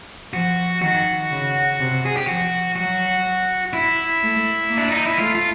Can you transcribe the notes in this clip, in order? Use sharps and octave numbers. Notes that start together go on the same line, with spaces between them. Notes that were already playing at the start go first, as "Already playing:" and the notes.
F3 F#4
D#3 F#4
C#3
C3
G#4
G4
F3 F#4
F#3 F#4
E4
A3
A#3
D4
D#4
E4
A3 F4
F4